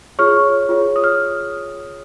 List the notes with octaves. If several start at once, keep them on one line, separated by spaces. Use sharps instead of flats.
F4 G#4 C#5 C#6 F6
F4 G#4 C#5
D#6
F6